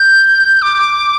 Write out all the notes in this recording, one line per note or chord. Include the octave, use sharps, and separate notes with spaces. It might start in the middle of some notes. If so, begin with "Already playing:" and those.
Already playing: G6
D6